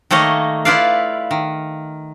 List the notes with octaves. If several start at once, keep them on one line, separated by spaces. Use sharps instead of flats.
D#3 A3 A#3 C#5 D#5
E4 F4 B4 D5 F5
D#3